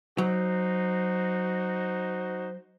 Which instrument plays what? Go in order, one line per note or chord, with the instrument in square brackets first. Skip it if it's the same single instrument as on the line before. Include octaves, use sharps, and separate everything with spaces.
[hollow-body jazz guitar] F#3 [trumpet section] D#4 F#4 [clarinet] C5